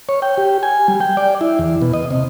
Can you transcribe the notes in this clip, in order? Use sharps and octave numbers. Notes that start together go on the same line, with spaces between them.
C#5
G5
G4
G#5
G3
G5
D5
E4
E2
B2
D#5
C3